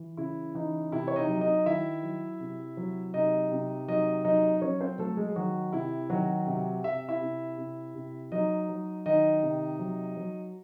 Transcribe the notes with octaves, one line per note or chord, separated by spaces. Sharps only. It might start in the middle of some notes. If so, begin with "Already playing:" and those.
Already playing: E3
C#3 E4
E3 D#4
C3 E4
C#5
D#4 D#5
F#3
D#4 D#5
D#3 E4 E5
F#3
C3
F#3
C3 D#4 D#5
C3
F#3 D#4 D#5
F#3 D#4 D#5
D#5
F#3 C#4 C#5
C4 C5
F#3 A3 A4
G#3 G#4
G#4
D#3 F#3 F#4
C3 E4
D#3 F#3 F#4
C3
C3 E5
E4 E5
C3
C3
C3
F#3 D#4 D#5
F#3
D#3 D#4 D#5
C3
F#3
F#3